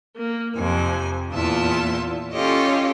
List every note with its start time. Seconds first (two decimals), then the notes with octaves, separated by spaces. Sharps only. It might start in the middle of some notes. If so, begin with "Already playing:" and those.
0.15 A#3
0.56 F2 C3 G#5
1.31 E2 A#2 F4 E5 A5
2.33 C#4 F4 G4 A4 C#5 D#5